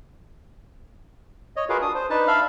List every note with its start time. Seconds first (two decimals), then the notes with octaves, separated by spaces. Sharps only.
1.56 C#5 D#5
1.69 F4 F#4 G#4 A#4 B4 F5
1.82 D4 D#6
1.95 C5
2.10 D4 D#4 B4 A5
2.28 D4 E5 F5 B5 F6